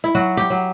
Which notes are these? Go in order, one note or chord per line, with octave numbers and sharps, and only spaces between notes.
E4
F#3 F#4
G4
F#3